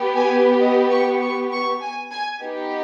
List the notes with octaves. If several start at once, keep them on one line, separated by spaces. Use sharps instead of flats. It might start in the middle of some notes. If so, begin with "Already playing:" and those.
Already playing: B3 G4
G#5
D#5
C#6
C#6
C#6
G#5
G#5
B3 D#4 G4